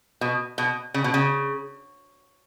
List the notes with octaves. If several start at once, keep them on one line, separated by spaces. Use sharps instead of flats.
B2
B2
C#3
B2
C#3